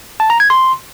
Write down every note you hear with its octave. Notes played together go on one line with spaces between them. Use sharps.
A5
A#5
G#6
C6